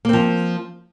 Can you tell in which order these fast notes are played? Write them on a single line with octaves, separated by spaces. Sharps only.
A#3 C4 F3